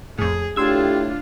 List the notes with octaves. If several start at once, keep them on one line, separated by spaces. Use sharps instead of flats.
F2 A2 G#4
A2 D4 F4 G4 C6 E6 G#6